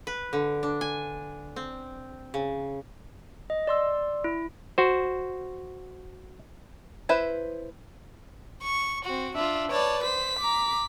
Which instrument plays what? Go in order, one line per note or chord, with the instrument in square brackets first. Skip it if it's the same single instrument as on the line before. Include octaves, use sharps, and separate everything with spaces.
[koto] B4
D3
D4
G#5
C4
C#3
[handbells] D#5
D5 C6 E6
E4
[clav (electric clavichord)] F#4 C5
[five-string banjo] E4 B4 C5 E5
[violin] C#6
C4 F#4
[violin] D4 F4 [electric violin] E5
[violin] B4 A5 [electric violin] C#5 D5
[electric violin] C5 [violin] B6
[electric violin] A#5 D6